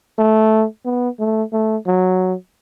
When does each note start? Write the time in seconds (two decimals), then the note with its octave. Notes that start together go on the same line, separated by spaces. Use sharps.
0.18 A3
0.85 B3
1.19 A3
1.53 A3
1.87 F#3